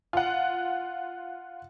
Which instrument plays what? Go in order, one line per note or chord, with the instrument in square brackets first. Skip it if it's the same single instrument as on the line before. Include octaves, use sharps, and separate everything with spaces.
[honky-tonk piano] F4 F#5